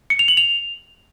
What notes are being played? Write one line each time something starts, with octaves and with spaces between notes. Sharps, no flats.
C#7
F7
F#7
F7